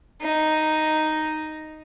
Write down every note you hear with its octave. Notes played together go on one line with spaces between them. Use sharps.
D#4